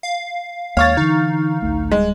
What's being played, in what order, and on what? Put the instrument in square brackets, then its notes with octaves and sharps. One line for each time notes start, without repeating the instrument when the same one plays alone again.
[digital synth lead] F5
[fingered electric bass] D#2 G#3 A#3 [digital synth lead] C#5 [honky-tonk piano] F5 C#6 A6
[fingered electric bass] D3 E3 [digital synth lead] D#4
[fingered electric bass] A1 D2 A3
[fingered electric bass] D1 G1 G3 [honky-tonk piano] G#3